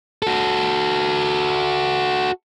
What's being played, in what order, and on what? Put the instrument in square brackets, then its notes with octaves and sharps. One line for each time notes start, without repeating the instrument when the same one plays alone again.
[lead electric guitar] F#4 A4